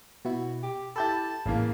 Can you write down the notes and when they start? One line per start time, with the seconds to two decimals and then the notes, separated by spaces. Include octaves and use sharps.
0.25 B2 E4 F#4
0.63 G4
0.96 E4 G4 A4 A5 B5 G6 A6
1.46 A1 C#3 E3 A#3